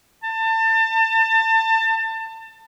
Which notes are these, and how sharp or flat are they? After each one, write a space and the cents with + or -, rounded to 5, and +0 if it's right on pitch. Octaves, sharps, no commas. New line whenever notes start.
A5 +30